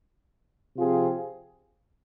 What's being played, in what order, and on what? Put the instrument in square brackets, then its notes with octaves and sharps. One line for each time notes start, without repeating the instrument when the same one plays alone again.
[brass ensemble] C3 F3 C4 F4 G#4